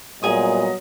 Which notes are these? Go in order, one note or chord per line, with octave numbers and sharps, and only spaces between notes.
A#2 F#3 G3 B3 G#4 D#5 G#5 D#6